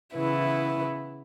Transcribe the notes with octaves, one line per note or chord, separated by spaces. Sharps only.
C#3 E3 B3 E4